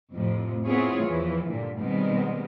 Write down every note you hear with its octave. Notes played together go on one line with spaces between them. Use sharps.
F2 A2 C3 F3
B3 C4 E4 F4 G#4 C#5
E2 E3 F3
G2 A#2 D3
B2 D#3 G3 G#3 B3 C4